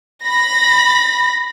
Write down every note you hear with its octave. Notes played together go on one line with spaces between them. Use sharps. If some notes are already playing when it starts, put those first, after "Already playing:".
B5 A#6